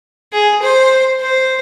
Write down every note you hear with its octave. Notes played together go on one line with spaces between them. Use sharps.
G#4
C5
C5